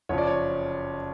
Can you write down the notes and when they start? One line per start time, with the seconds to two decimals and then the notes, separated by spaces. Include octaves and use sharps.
0.09 F#1 F2 F3 C#5
0.18 D5
0.27 C#5